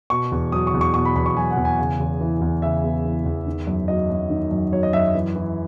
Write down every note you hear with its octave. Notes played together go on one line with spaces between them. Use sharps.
B2 C#6
E2
F#3 D#6
C#6
E2
C#6
B2 C#6
B5
E2 B5
C#6
F#3 G#5
F#5
E2
G#5
C#3
E2
E3
E2
C#3 E5
E2
E3
E2
D#3
F#2
F#3 D#5
F#2
D#3
F#2
F#3 C#5
D#5
F#2 E5
E3
E3